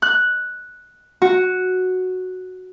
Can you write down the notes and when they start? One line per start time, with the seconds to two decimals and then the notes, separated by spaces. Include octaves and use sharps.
0.02 F#6
1.22 F#4